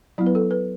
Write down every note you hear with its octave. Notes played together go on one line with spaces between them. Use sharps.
F#3 B3 E4
B4
A4
B4